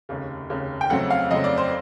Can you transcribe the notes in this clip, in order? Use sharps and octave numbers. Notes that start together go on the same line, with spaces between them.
F1 D#2 C#3
F1 D#2 C#3
G5
F2 C#3 F#3 A3 C4 F#5
F5
F2 C#3 F#3 A3 C4 D#5
D5
C5